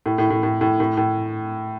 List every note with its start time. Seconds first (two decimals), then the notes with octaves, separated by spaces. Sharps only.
0.06 A2
0.18 A2
0.30 A2
0.43 A2
0.61 A2
0.80 A2
0.97 A2